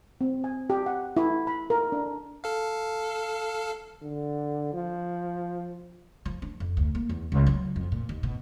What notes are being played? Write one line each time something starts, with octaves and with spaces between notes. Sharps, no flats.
C4
G#5
G4
F#5
E4
B5
A#4
D4
A4 F5
D3
F3
F3
D4
F2
D2
A#3
E2
C#2
F#3
F2
A#2
D#2
B2